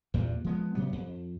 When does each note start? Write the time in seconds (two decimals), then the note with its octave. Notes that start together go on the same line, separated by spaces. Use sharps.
0.14 E2 G2 A#2
0.44 F3 G#3 B3
0.75 C3 F#3 G3 B3
0.92 F2